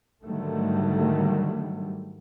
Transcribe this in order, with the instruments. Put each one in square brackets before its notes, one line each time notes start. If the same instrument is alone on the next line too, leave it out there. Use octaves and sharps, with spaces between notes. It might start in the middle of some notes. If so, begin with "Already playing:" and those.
[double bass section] G#2 D3 D#3 F#3 G3 A3